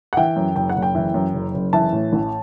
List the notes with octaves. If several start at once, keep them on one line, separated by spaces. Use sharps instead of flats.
F#5
E3 G5
F#2
F#1 G5
F#5
F#1
G5
E3
F#2
F#1
F#1
E3 A5
A2
A1